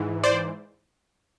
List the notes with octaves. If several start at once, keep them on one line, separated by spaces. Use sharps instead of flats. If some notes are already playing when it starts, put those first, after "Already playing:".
Already playing: G#2 E3
C5 D5